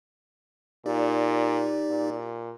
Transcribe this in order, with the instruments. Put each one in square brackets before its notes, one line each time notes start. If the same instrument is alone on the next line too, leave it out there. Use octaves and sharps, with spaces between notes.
[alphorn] A#2 [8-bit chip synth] D#4 G4 D5
[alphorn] A#2